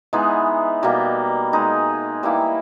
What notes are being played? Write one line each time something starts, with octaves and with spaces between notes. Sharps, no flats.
E3 G#3 B3 D#4
B2 G3 A#3
G#3 D#4 G#4
E3 G3 A#3 E4